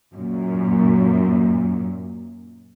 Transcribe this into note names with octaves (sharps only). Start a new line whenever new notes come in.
F#2 A#2